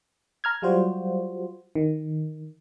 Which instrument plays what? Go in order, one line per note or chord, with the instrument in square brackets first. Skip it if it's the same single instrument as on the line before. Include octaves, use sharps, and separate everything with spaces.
[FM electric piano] A#5 F6 G#6
F#3 G3 F4 F#4 C5
D#3